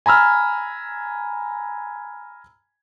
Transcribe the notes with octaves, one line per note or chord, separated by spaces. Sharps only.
G#5 A#5 B5 E6 F6